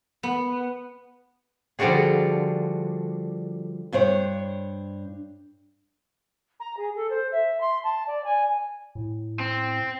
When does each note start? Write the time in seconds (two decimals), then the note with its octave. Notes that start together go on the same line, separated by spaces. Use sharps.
0.23 B3
1.79 D3 F3 G3 D4 F#4 G#4
3.92 G2 D4 C5 C#5
6.60 A#5
6.77 G#4
6.95 A4
7.10 C5
7.32 E5
7.60 C6
7.84 A5
8.07 D5
8.24 G#5
8.95 A2
9.40 C4